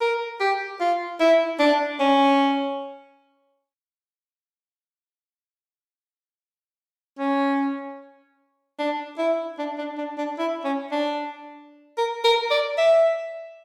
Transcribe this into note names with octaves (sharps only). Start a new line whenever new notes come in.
A#4
G4
F4
E4
D4
C#4
C#4
D4
E4
D4
D4
D4
D4
E4
C#4
D4
A#4
A#4
D5
E5